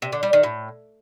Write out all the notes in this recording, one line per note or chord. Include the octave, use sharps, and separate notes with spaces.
C3
D3
G3
D#3
A2